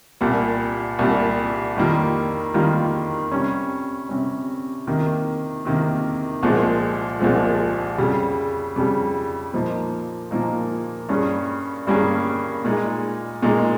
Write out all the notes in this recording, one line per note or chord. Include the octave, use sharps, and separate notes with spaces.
C2 A#2 G3
C2 A#2 G3
F2 D#3 G3 A#3 F4
F2 D#3 G3 A#3 F4
C3 G3 C#4
C3 G3 C#4
C3 D#3 A#3
C3 D#3 A#3
C2 A#2 F3 G#3
C2 A#2 F3 G#3
F2 C#3 G3
F2 C#3 G3
A#2 F3 A#3 D#4
A#2 F3 A#3 D#4
G2 G3 A#3 C#4 G#4
G2 G3 A#3 C#4 G#4
A#2 G#3 D#4
A#2 G#3 D#4